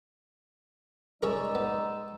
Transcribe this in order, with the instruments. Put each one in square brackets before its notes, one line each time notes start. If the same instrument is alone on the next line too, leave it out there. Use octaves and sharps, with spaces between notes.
[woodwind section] G#3 D5 E6 [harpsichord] C#4 G#4 A#4 [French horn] D#4
[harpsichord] B3